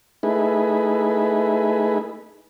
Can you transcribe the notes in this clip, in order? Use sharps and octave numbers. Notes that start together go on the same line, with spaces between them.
A3 D#4 E4 G#4 B4